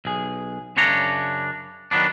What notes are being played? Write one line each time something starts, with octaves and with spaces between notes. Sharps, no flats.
B1 G#4
F#2 C#3 D4 C#5 A#5
D#3 F#3 B3 D4